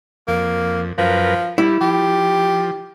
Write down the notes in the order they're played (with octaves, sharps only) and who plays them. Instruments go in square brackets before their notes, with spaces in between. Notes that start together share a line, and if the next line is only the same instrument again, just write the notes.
[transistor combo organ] F2 [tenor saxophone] A#3
[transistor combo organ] F#2 A#4 B4 [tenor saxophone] F3
[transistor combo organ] G3 [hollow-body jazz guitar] E4
[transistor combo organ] F3 [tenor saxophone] G4